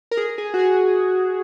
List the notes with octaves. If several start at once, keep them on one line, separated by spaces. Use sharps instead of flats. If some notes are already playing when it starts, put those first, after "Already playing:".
A#4
G#4
G#4
F#4
G#4